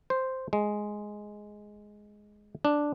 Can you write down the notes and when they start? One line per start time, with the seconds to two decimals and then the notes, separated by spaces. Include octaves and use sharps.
0.10 C5
0.53 G#3
2.65 D4